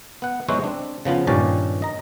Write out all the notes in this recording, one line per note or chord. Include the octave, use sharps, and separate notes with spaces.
B3 F#5
F#3 G#3 B3 E4 F#4 C5
C4 D4
C#3 F3 B3 F4
G2 A#2 D#3 C#4 G4 A5
D#5 A#5